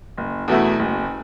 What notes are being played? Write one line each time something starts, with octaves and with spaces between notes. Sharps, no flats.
F#1
E2 B2 A3 E4
F#1